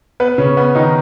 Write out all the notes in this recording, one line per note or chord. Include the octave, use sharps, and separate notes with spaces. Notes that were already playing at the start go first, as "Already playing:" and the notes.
B3 B4
C#3 C#4
B3
D#3 D#4